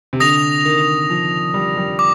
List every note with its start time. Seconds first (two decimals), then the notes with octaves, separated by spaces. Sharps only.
0.13 C3
0.20 D3 D#6 A#6 F7
0.65 D#3
1.10 F3
1.54 G3
1.77 G3
1.99 D6